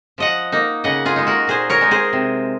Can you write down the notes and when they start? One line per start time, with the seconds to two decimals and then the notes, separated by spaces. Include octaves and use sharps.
0.18 F3 D#5 F#5
0.52 A#3 D#4
0.84 C#3 D#5 F#5
1.06 F4 G#4
1.16 G#3 D#4
1.27 F#4 A#4
1.47 A#2 G#4 C5
1.70 A#4 C#5
1.81 G#3 D#4
1.91 G#4 C5
2.13 C3